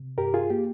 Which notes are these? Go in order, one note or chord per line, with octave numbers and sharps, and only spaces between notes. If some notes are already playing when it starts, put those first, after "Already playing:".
Already playing: C3
G2 G4 A#4
F4 G#4
A#3 G4